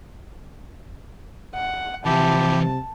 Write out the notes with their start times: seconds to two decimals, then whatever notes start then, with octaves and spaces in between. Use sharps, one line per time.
1.55 F#5
2.06 C3 E3 F3 E4 G4 A5